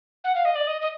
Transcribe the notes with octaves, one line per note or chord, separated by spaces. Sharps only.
F#5
F5
D#5
D5
D#5
D#5